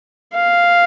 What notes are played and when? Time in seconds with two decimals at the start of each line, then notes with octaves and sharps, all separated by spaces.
0.34 F5